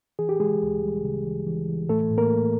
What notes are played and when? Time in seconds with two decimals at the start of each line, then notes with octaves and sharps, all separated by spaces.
0.19 E3 G#4
0.29 G4
0.40 E3 G#3 G#4
0.62 D2
0.83 G3
1.04 C#3
1.25 E3
1.47 E3
1.69 E3
1.89 A2 A3 A4
2.10 A2
2.18 A#3 A#4
2.32 A3